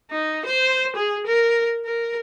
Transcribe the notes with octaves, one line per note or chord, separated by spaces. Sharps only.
D#4
C5
G#4
A#4
A#4